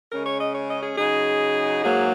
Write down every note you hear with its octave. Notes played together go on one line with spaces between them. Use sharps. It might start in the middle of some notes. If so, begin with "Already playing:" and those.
C#3 G#3 C#4 A#4
C#5
D#5
C#5
D#5
G#4
C#3 F#3 D#4 G#4
G#2 F#3 A#3 G#4